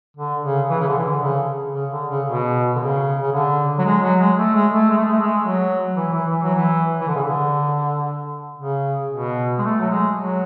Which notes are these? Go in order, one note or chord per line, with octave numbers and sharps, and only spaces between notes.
D3
C#3
E3
C#3
D3
E3
D3
C#3
C#3
D3
C#3
B2
D3
C#3
C#3
D3
F#3
G#3
F#3
G#3
A3
G#3
A3
G#3
A3
G#3
A3
G#3
F#3
E3
E3
E3
F#3
E3
E3
D3
C#3
D3
C#3
B2
G#3
A3
F#3
G#3
F#3